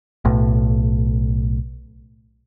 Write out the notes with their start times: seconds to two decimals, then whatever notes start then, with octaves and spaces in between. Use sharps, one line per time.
0.25 B1 A2